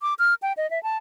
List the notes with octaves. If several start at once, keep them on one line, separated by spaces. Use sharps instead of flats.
D6
F6
G5
D#5
E5
A5